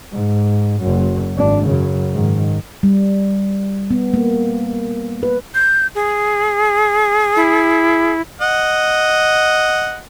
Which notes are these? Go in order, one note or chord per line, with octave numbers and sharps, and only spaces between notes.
G#2
F#1 F#2
G#1 D4
F#2 C#3
G#2 D#3
G3
B3
A#3
B4
G6
G#4
E4
D#5 F#5